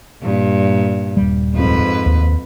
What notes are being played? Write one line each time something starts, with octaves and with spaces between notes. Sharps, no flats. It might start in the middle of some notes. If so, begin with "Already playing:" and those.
G2 A#2
D#1 G3
F2 G#2 B4
D#2